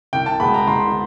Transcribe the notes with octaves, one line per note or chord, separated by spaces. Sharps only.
C2 G5
A5
B2 G#3 B3 B5
A#5
C2 C6